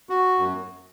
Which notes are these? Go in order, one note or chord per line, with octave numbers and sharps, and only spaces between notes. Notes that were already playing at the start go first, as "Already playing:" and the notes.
F#4
F#2